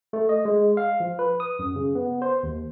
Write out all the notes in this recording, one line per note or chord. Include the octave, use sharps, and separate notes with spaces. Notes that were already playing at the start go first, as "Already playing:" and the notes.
A3
D#5
G#3
F5
F3
B4
D#6
F#2
C#3
B3
C5
D#2